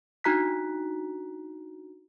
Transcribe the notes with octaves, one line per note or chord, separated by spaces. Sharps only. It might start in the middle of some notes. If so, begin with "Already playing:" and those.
D4 D#4 F#4 A#5 F#6 B6